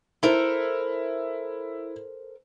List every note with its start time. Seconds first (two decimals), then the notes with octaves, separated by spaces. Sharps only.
0.23 E4 A4 A#4 C5